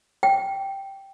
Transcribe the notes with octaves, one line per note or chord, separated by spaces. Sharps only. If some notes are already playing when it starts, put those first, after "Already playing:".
G5